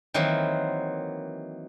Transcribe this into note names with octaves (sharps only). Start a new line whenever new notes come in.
D#3 E3 F#3 A#3 C4